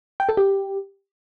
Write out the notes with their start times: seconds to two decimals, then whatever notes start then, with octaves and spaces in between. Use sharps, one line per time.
0.20 G5
0.29 A4
0.37 G4